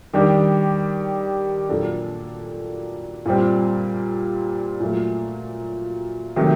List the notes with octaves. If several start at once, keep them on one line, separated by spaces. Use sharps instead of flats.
D#3 G3 D4 G4
A#2 F#3 A#3 D4 A4
A#2 G3 C4
A#2 F#3 A3
C3 D#3 F#3 A3